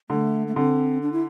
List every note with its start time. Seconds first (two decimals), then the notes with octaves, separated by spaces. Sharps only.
0.10 D3 A3
0.47 A3
0.56 D3 C4
1.02 D4
1.13 E4